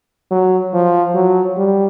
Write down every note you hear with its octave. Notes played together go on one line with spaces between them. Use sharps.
F#3
F3
F#3
G3